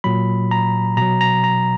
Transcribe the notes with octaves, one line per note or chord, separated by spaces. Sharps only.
A#2 F#3 B5
A#5
B2 F#3 A#5
A#5
A#5